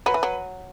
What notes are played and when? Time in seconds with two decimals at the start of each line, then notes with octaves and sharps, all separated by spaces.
0.06 F#3 B4
0.14 E3
0.23 F#3